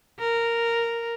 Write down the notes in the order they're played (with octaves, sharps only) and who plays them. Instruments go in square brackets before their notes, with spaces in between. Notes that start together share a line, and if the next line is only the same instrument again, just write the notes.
[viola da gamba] A#4